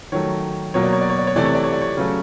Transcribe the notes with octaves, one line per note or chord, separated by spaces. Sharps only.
D#3 F#3 A3 C#5
B2 F#3 A#3 C#5
D5
C#5
D5
C#5
D5
C#5
C3 E3 A3 D5
C#5
D5
C#5
D5
C#5
C#3 F#3 A3